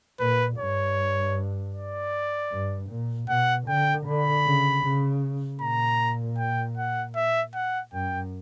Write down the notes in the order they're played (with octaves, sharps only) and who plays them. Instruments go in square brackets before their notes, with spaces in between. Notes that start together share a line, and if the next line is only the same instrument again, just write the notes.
[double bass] A#2 [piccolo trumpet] B4
[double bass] G2 [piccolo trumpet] C#5
[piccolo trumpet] D5
[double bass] G2
A#2
[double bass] B2 [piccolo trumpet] F#5
[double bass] D3 [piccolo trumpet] G5
[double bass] D3 [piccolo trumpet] B5
[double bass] C#3
C#3
[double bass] A#2 [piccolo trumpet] A#5
[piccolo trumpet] G5
F#5
E5
F#5
[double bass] F#2 [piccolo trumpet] G5